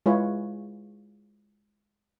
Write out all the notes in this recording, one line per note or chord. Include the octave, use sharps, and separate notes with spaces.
G#3 E4 F4 G#4 B4 C#5